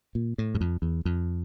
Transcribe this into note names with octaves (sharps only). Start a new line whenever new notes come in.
A#2
A2
G2
F2
E2
F2